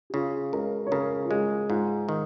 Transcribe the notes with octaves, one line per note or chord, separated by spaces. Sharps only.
G#4
C#3 F4
C#2 A#4
C#5
C#3 A#4
F4
G#3 G#4
G#2 F4
D#3